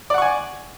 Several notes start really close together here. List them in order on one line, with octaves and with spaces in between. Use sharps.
D5 F#5 C#6 G#5